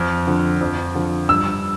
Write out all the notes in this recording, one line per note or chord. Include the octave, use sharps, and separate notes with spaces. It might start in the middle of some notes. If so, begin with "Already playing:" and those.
Already playing: F2 F6
D3 F3
F2
D3 F3
G2 E6